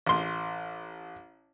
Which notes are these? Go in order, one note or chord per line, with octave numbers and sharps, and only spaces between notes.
A1 C6